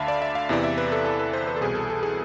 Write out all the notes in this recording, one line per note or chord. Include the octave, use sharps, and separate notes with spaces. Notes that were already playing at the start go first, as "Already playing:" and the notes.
Already playing: D2 D3 E5 F5 A5 B5
D5
E5
F5
E2 C3 E3 D5
E5
B4
A4
A4
B4
C5
B4
A4
C2 B2 G#4
A4
A4
G#4